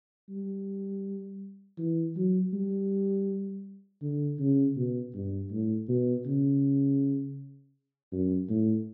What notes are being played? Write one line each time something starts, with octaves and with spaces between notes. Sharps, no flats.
G3
E3
F#3
G3
D3
C#3
B2
G2
A2
B2
C#3
F#2
A2